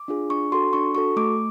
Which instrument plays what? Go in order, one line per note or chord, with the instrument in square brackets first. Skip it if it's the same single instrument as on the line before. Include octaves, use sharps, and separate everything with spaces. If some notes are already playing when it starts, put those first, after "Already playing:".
Already playing: [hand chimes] D6
D4 F4 G#4
D4 C#6
F#4 A4 C6
D4 C#6
F#4 A4 C#6
A3 D6